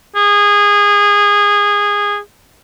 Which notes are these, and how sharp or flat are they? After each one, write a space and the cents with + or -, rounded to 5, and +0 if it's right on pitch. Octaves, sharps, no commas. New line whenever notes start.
G#4 -20